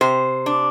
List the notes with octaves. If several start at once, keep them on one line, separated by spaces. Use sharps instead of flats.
C3 C5
D4